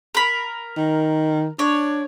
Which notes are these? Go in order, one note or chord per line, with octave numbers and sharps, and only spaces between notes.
A#4 B5
D#3
D4 C#5